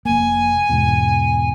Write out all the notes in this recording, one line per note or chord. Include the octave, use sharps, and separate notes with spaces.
F1 A#3 G#5
E2 G#2 B2